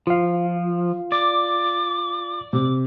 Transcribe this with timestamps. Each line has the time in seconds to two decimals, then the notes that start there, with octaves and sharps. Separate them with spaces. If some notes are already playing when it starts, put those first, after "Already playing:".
0.07 F3 F4 F5
1.12 D5 D6
2.53 C3 D6